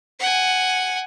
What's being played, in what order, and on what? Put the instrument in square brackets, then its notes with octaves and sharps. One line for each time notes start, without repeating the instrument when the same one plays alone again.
[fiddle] F#5 G#5